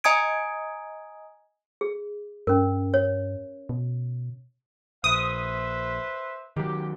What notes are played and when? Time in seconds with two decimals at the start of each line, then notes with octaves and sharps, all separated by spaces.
0.04 D#5 G#5 A#5 D#6 G#6 D7
1.81 G#4
2.47 G2 C#4 A#4
2.94 C#5
3.69 B2
5.04 A#1 B4 C5 E5 D#6
6.57 D#3 F#3 G4